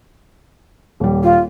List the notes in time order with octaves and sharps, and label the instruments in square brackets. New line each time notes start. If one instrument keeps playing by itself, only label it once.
[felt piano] D#1 G3
[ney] F4